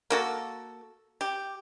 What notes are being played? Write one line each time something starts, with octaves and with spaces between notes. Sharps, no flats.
A#3 F#4 A4
G4